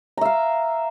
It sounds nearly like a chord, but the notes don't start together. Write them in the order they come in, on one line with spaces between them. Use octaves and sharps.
A#5 E5 F5